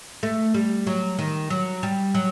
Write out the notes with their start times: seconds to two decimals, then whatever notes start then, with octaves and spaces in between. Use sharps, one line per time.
0.23 A3
0.54 G3
0.87 F#3
1.19 D#3
1.50 F#3
1.83 G3
2.15 F#3